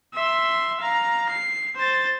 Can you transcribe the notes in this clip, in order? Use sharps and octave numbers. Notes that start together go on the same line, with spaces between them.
E5 C6
F5 A#5
C7
C5 A6